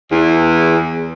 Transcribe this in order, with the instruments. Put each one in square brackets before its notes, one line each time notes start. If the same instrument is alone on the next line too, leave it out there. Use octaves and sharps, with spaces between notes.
[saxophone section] E2